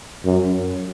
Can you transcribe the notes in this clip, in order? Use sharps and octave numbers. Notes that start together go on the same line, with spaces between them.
F#2